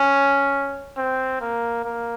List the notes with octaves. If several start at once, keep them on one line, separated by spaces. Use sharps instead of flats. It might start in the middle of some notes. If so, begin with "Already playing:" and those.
Already playing: C#4
C4
A#3
A#3